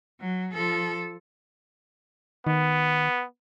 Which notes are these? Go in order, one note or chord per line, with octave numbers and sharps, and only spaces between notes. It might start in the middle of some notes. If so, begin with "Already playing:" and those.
F#3
F3 A4
D#3 B3